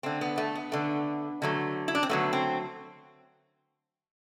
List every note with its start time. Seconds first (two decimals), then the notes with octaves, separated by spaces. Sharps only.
0.03 D3 A3 C4
0.21 B3
0.38 A3
0.55 B3
0.72 D3 A3
1.42 D3 F#3 A3
1.88 E4
1.95 D4
2.03 C4
2.09 D3 F#3 A3 B3
2.33 C4